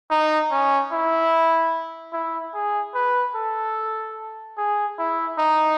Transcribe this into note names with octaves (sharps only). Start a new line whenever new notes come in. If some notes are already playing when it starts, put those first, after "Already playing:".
D#4
C#4
E4
E4
G#4
B4
A4
G#4
E4
D#4